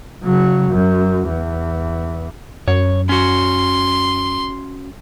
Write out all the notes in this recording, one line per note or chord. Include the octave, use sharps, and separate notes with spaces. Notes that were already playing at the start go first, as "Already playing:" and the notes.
C#3 F#3
F#2
E2
F#2 C#5
C#4 F#4 C6